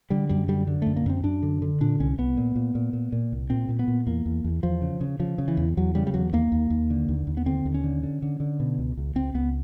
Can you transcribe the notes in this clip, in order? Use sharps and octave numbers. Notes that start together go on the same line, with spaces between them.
D3 G3
F#2 G3
D3 G3
D3
F#2 A3
A#3
F#2 C4
F#2 D4
D3
D3
A#2 D4
C2 C#4
C2 B3
A#2
A#2
A#2
A#2
A#2
C2
A#2 C4
A#2
B3
A#2
E2 A#3
E2
E2
E2 F3
C#3
C#3
C#3 F3
C#3
E3
E2
E2 F#3
C#3 G3
G3
E2 F#3
D#2 A#3
D#2
D#2
D3
D#2
D#2
B3
D3 C4
D#2
C#4
D3
D3
D3
D3
B2
C#2
C#2
C#2 C4
C#2 B3